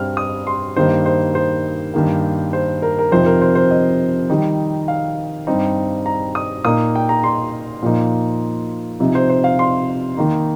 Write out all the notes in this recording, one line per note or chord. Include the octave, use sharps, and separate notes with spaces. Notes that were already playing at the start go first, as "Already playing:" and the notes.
Already playing: G2 G3 C4 F6
D#6
C6
G2 D#3 A#3 D#4 C5
C5
C5
G2 D#3 A#3
C5
A#4
A#4
F2 C3 F3 C4 D#4 C5
A#4
C5
C5
D#5
D#3 G3 D#4
F5
G2 G3 C4 D#4
A#5
D#6
A#2 A#3 D#4 D#6
G5
A#5
C6
A#2 F3 A#3 D#4
C3 F3 D#4
C5
C5
F5
C6
D#3 A#3 D#4